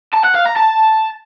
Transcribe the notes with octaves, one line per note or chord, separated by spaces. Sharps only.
A5
F#5
F5
A#5
A5